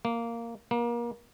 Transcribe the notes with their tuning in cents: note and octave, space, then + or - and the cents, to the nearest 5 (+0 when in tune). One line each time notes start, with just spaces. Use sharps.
A#3 -5
A#3 +30